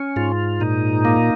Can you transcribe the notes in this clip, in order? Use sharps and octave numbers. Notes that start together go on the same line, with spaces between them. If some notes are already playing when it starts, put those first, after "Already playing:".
Already playing: C#4
G#2 F4
A#2 D#4
A#3